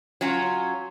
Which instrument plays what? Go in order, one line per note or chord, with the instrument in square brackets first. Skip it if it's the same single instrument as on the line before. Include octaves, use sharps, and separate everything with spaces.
[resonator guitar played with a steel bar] F#3 C#4 F4